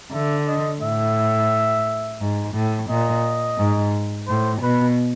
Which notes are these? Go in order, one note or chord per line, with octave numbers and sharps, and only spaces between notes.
D3 E5
D#5
A2 E5
G#2
A2
A#2 D#5
G#2
A2 C5
B2 B4